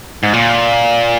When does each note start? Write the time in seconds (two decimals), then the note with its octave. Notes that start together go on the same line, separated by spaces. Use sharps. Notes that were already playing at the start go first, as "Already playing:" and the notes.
0.23 G#2
0.33 A#2